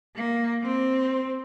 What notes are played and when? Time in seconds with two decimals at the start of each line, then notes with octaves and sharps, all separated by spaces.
0.16 A#3
0.63 C4